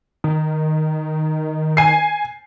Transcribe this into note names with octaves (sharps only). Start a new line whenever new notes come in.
D#3
G#5 C7